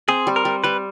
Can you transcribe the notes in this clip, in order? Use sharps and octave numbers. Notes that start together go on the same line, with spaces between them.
C4 G#4
G3
A#4
G3
G3 B4